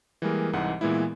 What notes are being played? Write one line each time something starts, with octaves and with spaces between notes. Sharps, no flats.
E3 G3 G#3 A#3 G#4 A#4
C2 G#2 E3 D#4 F#5
A#2 E3 G#3 B3 E4